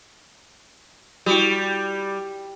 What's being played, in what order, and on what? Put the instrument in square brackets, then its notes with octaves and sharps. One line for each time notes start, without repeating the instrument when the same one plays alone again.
[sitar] G3 [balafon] E4 F#4